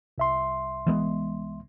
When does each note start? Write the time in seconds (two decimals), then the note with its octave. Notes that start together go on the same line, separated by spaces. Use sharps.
0.18 C2 E5 C6
0.86 E3 G#3 B3